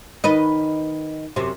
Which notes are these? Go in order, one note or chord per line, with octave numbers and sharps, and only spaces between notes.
D#3 B4 D#5
F#2 C3